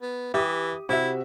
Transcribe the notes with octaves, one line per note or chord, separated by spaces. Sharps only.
B3
E3 G4 E5 D#6
C3 E4 F#4 E5